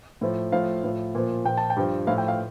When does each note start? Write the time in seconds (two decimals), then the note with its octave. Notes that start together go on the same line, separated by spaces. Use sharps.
0.21 A2 F3
0.52 A2 F3 F5
0.84 A2 F3
1.15 A#2 F3
1.45 A#2 F3 G5
1.57 A5
1.70 G5
1.76 G2 F3
2.07 A2 F3 F5
2.18 G5
2.28 F5